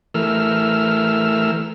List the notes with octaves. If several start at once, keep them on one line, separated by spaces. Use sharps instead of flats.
E3 A3 A#4 E6 F6